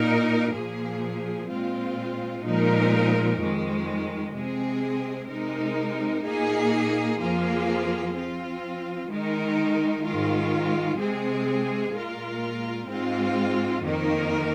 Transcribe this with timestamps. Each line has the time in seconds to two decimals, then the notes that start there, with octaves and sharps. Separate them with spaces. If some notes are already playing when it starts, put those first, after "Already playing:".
Already playing: A#2 A#3 D#4 A#4
0.54 A#2 F3 A#3 G#4
1.50 A#2 G#3 C4 F4
2.44 A#2 F3 G#3 D#4 A#4
3.39 F2 D#3 G#3
4.34 C3 G#3 C4 G#4
5.29 C3 G#3 D#4 A#4
6.23 A#2 A#3 D#4 G#4
7.19 F2 F3 A#3 F4 G#4
8.14 F3 C4 F4
9.08 D#3 G#3 D#4 A#4
10.04 G#2 D#3 G#3 F4
10.98 C3 G#3 C4 G#4
11.93 A#2 G#3 F4 A#4
12.88 G#2 G#3 C4 F4
13.83 F2 D#3 A#3 D#4 A#4